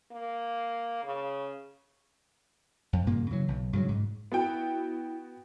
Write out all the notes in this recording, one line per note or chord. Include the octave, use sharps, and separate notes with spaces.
A#3
C#3
F2
G2 A#2 C#3 A#3
C#3 E3 F#3
B1
G2 C#3 E3 F#3
G#2
B3 E4 F#4 G5